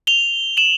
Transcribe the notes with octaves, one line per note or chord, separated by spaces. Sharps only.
F7 G7
E7 F#7